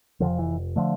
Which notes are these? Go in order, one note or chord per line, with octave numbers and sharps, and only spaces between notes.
F1 F2 D3 F3
E3
D3 F3 A3